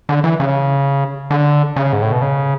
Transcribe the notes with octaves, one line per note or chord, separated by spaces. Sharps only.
D3
E3
C#3
D3
C#3
G#2
A2
B2
C#3